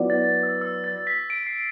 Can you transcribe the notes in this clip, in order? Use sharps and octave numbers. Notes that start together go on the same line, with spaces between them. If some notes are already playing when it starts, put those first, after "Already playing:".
Already playing: F#3 B3 E4 B4 D5
A6
E6
E6
A6
B6
D7
C7